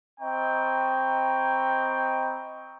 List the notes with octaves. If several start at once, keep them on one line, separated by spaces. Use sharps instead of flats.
C4 D#5 G5 A#5 B5 C#6